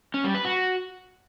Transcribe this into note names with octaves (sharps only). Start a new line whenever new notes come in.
C#4
G3
B4
F#4